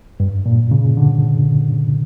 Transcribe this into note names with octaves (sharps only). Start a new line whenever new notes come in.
G2
A#2
C#3
D3